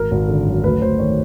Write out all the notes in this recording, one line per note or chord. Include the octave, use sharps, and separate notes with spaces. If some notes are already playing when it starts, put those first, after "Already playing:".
Already playing: G#1 A#4
G#1
D3
F#2
D2 B4
D2 C5
D#3 C#5